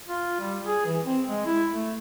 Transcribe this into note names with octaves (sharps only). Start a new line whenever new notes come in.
F4
G3
G#4
E3
C4
G#3
E4
A3